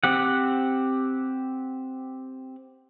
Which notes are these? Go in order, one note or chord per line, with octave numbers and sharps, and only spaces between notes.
C4 G4 F#5